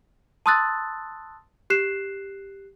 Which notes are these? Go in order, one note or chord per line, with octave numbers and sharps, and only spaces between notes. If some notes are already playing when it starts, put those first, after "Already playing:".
A5 C6 D#6 E6 F#6 A6
G4 F#6 C7 E7